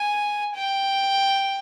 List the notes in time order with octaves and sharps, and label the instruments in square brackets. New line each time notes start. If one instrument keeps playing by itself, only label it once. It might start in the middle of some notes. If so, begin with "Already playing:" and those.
Already playing: [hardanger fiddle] G#5
G5